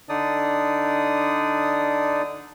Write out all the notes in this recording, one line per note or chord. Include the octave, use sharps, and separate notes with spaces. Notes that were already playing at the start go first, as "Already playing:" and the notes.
D3 D4 D#4 D5 D#6